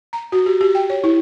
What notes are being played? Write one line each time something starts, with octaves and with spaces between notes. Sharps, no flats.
A#5
F#4
G4
G4
G5
C#5
E4